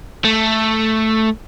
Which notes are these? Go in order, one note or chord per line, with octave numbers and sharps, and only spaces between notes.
A3